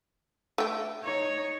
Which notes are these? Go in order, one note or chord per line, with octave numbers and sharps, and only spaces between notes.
A3 G5
D#4 C#5